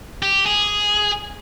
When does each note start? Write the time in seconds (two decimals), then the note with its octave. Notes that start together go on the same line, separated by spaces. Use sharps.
0.22 G4
0.46 G#4